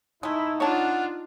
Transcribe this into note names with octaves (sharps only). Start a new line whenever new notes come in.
G#3 A3 D#4 E4
D4 F4 C#5 F#5 A5